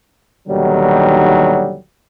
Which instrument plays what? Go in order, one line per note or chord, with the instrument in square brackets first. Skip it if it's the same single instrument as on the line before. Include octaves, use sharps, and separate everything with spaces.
[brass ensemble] D#2 B2 D3 D#3 F#3 G3